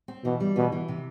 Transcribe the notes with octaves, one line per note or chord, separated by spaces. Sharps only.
C4
B2 E3
G3
B2 E3
E3
C3